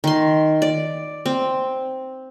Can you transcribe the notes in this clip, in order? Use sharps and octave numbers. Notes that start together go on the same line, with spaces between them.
D#3 C6
D5
C4